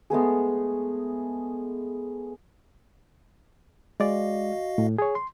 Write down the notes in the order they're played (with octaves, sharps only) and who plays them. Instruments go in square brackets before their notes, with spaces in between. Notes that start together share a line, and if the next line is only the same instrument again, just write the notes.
[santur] G#3 A3 B3 G#4
[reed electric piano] G#3 D5 [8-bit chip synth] F#4 D#5 F5
[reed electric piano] A2
G#4 C#5
C6